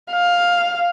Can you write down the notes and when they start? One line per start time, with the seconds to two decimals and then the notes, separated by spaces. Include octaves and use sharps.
0.12 F5